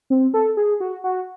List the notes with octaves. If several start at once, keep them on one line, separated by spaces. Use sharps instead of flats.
C4
A4
G#4
F#4
F#4